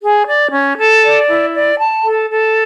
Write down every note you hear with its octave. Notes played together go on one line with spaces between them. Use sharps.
G#4
D5
C#4
A4
D5
E4
D5
A5
A4
A4